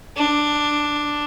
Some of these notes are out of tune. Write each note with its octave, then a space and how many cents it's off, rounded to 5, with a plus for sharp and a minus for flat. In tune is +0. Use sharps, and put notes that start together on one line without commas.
D4 +5